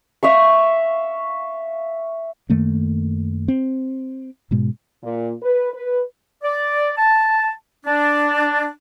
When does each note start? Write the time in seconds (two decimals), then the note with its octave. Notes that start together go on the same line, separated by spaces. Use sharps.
0.23 E5 F5 C#6
2.50 F#2 D#3 A3 A#3
3.48 C4
4.51 G#2 B2 G#3
5.04 A#2
5.43 B4
5.73 B4
6.44 D5
6.98 A5
7.85 D4